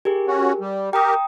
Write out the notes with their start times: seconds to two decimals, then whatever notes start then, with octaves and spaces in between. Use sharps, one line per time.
0.05 G4 G#4 A#4
0.28 C#4 F#4
0.61 G3
0.93 G4 A#4 G5 A#5 D#6